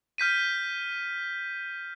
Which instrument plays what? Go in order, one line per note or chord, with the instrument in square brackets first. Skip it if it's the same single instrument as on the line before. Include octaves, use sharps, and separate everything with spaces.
[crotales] F6 G6 B6 D#7